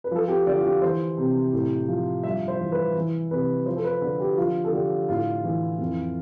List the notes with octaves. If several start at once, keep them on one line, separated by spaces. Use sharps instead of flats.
B4
F3 A4
G4
D3 D5
F4
G4
E3 C5
C3
A2
F3
G2 E5
C5
E3
B4
E3
C3 B4
F3 C5
A4
B4
D3 A4
G4
F3 F4
A4
D3 G4
A2 F4
E3
F2